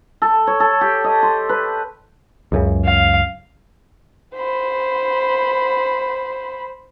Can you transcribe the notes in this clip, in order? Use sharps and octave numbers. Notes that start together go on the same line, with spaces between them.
A4
C#5
A4
G4
D#5
C6
B4
C#2 F#2 C#3
F5
C5 B5